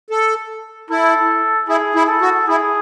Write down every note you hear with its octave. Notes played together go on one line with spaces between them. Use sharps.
A4
E4 A4
E4 G#4
E4
A4
F#4
E4 G#4